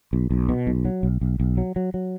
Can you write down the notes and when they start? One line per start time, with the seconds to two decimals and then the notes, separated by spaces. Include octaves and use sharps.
0.13 B1
0.30 B1
0.49 B2
0.67 B1
0.85 F#3
1.03 B1
1.21 B1
1.40 B1
1.57 F#3
1.76 F#3
1.94 F#3